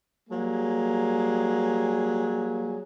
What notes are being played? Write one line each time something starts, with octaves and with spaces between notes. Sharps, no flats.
F#3 G3 A#3 G#4